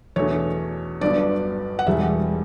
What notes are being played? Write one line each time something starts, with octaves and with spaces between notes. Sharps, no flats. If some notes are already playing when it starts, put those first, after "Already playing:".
E2 B2 A3 D4 C#5
G1 G2 F#3 B3 D4 D5
F#5
E1 E2 B2 G3 E5